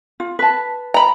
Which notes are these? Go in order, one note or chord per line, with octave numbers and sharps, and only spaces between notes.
F4
B4 A5
A#5 B5